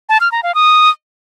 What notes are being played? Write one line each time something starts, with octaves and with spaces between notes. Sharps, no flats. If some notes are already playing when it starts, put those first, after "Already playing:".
A5
F6
A#5
F5
D#6